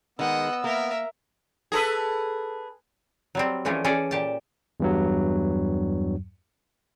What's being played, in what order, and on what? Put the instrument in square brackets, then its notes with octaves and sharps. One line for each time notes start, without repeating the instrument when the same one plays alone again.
[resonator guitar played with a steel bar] D#3 G#3 [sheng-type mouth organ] B3 E6 [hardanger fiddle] D#5 F#5
[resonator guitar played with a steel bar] A#3 [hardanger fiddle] A#4 E5
[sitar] G#4 A4 B4
[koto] F#3 G3 C4
E3 F3 A3 C#4 G4 G#4
E3 C#4 G#4 A4 D5
A#2 G4 A5
[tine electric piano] E2 G2 F#3